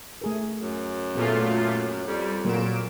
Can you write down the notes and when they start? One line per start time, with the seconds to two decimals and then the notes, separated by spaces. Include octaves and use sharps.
0.21 A3 G#4 A#4
0.60 F#2
1.15 A#2 A3 B3 F4 G#4
2.07 F2 G3
2.45 A#2 F#3 A#3 F#4 D7 E7